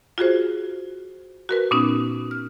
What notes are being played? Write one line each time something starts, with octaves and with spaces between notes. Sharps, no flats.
F4 F#4 G#4 C5
F#4 A#4 B4
A#2 B3 C#4 D#4
F6